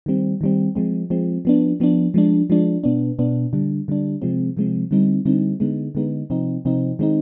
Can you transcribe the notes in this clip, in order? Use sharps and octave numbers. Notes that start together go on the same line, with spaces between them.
D#3 G3 C4
D#3 G3 C4
F3 G#3 C4
F3 G#3 C4
F3 B3 D4
F3 B3 D4
F3 G#3 D4
F3 G#3 D4
B2 B3 D4
B2 B3 D4
D3 G3 D4
D3 G3 D4
C3 F3 G#3 C4
C3 F3 G#3 C4
D3 G3 C4 D#4
D3 G3 C4 D#4
D3 G#3 B3 D#4
D3 G#3 B3 D#4
C3 F3 C4 D#4
C3 F3 C4 D#4
D#3 G#3 C4 D#4